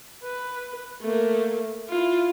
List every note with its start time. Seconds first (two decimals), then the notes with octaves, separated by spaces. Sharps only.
0.23 B4
1.02 A3 A#3
1.89 E4 F4